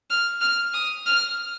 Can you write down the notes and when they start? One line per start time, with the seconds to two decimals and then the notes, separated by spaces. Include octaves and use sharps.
0.10 F6
0.41 F6
0.74 D#6
1.06 F6